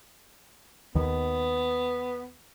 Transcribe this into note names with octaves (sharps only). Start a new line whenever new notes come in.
D#2 B3